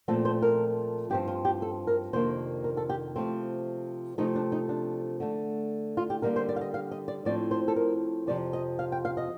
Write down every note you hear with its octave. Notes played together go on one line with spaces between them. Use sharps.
A#2 F3 A3 C4 A4
C5
A#4
G2 F3 C4 G4
F4
G4
A4
A#4
F2 C3 D#3 A#3 D4 C5
A#4
A4
G4
C3 F3 A3 C4
C3 F3 A3 C4 D#4
D4
D#4
D4
D3 A3 D4
F4
G4
D3 G3 A#3 A#4
C5
D5
F5
D#5
F5
D#5
D5
A2 F3 C4 D5
C5
A4
A#4
F2 C3 F3 D5
D#5
F5
G5
F5
D#5